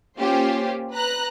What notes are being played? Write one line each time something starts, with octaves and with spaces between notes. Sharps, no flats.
A#3 C#4 F4 G4 C5
B4 A#5 F#6